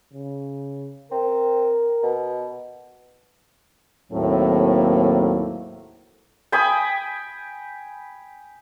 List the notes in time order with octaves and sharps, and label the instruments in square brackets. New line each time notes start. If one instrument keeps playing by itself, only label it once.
[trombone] C#3
[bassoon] C4 [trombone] A#4
[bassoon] B2
[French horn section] D#2 A2 F#3 A#3 C4 A4
[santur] G5 G#5 B5 D#6